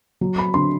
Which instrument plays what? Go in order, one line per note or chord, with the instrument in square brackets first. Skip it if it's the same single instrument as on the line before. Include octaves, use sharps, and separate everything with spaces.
[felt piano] F#3
B5
D3 C6